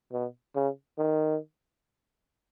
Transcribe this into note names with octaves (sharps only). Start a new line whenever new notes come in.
B2
C#3
D#3